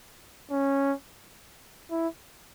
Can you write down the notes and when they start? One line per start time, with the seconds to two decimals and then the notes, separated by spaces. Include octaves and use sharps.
0.51 C#4
1.91 E4